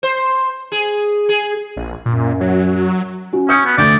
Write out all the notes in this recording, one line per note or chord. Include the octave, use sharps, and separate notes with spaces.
C5
G#4
G#4
A#1
F#2 A#2
F#3
C#4 F#4
C#4 D#6 G6 C#7
B3
D2 A3 D5 G6